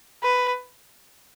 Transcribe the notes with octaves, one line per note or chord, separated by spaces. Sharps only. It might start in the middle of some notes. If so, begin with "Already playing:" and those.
B4